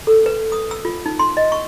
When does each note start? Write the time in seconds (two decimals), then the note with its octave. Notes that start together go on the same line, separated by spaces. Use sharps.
0.07 A4
0.26 B4
0.52 D#6
0.71 E6
0.85 F4
1.06 D#4
1.19 C6
1.37 D#5
1.52 C#6